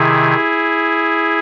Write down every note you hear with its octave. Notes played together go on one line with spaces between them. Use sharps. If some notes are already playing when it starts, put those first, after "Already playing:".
Already playing: C3 D#3 E4 G#4